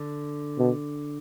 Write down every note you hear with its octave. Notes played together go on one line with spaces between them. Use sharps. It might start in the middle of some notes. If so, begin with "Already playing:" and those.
Already playing: D3
B2